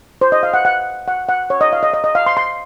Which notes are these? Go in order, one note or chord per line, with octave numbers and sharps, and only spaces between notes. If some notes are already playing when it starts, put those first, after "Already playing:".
C5
D#5
F5
F#5
F#5
F#5
F#5
C#5
D#5
F5
D#5
D#5
D#5
F5
C6
C6